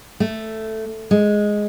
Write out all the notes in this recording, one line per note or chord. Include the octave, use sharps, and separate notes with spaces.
A3
G#3